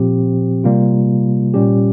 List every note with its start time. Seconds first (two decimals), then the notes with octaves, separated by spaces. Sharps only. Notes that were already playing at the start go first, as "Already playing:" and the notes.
Already playing: A#2 F3 C4 G4
0.64 C3 G3 A#3 F4
1.54 A#2 G3 C#4 G4